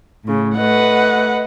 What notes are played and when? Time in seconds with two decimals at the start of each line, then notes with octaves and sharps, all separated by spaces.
0.25 A2 C#3
0.57 A3 B4 D#5 F#5